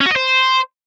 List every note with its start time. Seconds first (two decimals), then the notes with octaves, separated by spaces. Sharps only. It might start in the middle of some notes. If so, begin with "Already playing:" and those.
0.01 C#4
0.06 F#4
0.11 D#5
0.16 C5